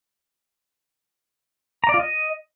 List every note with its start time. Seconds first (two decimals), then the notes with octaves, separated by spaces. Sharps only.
1.84 A#5
1.89 D5
1.94 F4
1.99 D#5